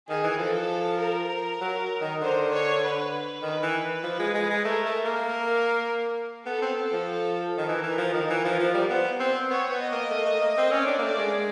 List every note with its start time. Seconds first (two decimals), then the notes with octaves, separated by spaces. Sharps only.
0.08 D#3 G#4
0.24 E3
0.38 F3 A4
1.00 A#4
1.61 F#3
2.01 D#3
2.21 D3 C5
2.51 C#5
2.82 B4
3.42 D#3 B4
3.63 E3
4.04 F3
4.19 G#3
4.35 G#3
4.50 G#3
4.64 A3 A#4
4.85 A3
5.05 A#3
5.26 A#4
6.46 B3 A4
6.62 C4
6.93 F3
7.58 D#3
7.69 E3 A#4
7.83 E3
7.98 F3
8.13 D#3
8.30 E3
8.44 F3
8.59 F3
8.74 G3
8.89 B3 C5
9.20 C4 C5
9.50 B3 C#5
9.71 B3
9.81 D#5
9.92 A#3
10.11 A3
10.26 A3
10.41 A#3
10.57 C4
10.71 C#4 D5
10.87 D4
10.99 A#3
11.02 A3 D5
11.18 G#3